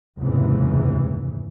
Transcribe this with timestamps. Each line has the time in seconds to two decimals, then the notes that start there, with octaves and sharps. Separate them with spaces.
0.18 F1 D#2 G#2 C#3 E3